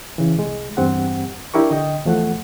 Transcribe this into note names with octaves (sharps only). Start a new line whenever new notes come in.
C#3 E3
C2 G#3
E2 G2 C4 G4 F#5
D4 E4 G4 A#4 C#6
D3 D#5 G5
E2 F3 A3 F#5